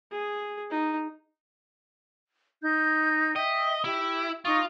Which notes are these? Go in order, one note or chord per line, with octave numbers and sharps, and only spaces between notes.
G#4
D#4
D#4 G6
D#5 E5 G5
E4 G4
D#4 F4 C#6 D#6